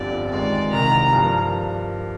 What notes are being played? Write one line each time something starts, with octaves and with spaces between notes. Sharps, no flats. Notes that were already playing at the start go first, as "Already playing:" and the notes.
Already playing: G1 F2 D3 G3 D5
F2 D#3 G#3 D5
C2 C3 D#3 A#5
G2 F3 A#3